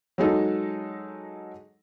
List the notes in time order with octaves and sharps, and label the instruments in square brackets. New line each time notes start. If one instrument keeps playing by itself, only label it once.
[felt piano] F#3 G#3 D#4 A4